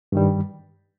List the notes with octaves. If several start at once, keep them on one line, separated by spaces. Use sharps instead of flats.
G2 D#3 G3